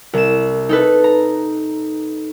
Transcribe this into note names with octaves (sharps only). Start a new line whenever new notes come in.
C2 E7
D#4 A4 B4
A#5